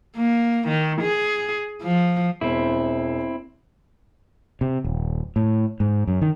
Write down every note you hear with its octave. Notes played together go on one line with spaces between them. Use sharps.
A#3
D#3
G#4
F3
E1 C4 E4
C3
D#1
A2
G#2
F#2
D#3